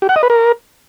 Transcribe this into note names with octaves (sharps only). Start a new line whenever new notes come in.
G4
F#5
D#5
B4
A#4